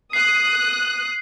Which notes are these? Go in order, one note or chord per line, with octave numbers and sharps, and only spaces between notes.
D#6 F#6 C7